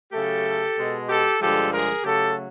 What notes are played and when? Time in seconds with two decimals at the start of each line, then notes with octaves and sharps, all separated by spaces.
0.12 C#3 F#3 A3 G4 A4
0.76 B2 G#3
1.09 G4 A4
1.40 G2 D3 F3 G#3 G4 A4
1.72 G#4 A#4
2.04 C#3 F#3 A3 G4 A4